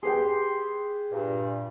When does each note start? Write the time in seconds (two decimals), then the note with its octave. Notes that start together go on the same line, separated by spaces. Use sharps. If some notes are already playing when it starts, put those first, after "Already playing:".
0.03 G4 G#4 B4 G5 C6
1.12 G2 A#2